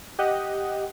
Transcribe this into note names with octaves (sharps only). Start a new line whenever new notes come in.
G4 D#5 F#5